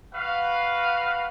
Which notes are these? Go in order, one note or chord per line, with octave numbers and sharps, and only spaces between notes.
F#4 B4 F5